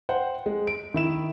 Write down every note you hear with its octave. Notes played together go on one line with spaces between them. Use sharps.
C5 F#5 G5
G#3
D7
D#3 E4 E7